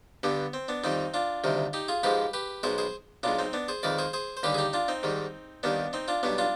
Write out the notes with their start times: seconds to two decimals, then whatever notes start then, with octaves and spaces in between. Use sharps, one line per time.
0.23 G2 D3 G3 B3
0.53 C4
0.68 B3 D4
0.84 F2 D#3 G3 C4 D#4
1.14 D4 F4
1.44 D2 C3 D#3 G3
1.73 D#4 G4
1.88 F4 G#4
2.03 G#2 F3 G#3 G4 B4
2.33 G4 B4
2.63 B1 B2 G#3 G#4 C5
2.78 G#4 C5
3.23 B1 B2 G#3 D4 F4
3.39 C4 D#4
3.53 B3 D4
3.68 G#4 C5
3.83 F2 D#3 G#3 B4 D5
3.99 G#4 C5
4.13 G#4 C5
4.37 C5
4.43 D#2 D3 G3 G4 B4
4.54 G#4
4.58 D#4 G4
4.73 D4 F4
4.88 C4 D#4
5.03 G#2 D#3 G3
5.63 D#2 D#3 G3 B3 D4
5.93 C4 D#4
6.08 D4 F4
6.23 B1 B2 G3 B3 D4
6.38 D4 F4